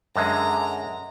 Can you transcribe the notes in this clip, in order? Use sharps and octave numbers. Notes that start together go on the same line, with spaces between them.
F#2 D3 G#3 A#4 D#5 E5 A#5